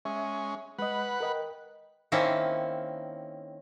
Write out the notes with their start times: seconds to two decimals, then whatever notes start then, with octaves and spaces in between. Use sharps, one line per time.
0.05 G#3 C#4 E5
0.79 G#3 B4 D#5 F#5
1.21 A#4 D#5 G5
2.12 D#3 A#3 C4 C#4 E4